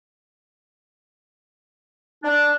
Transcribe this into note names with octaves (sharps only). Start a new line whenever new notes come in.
D4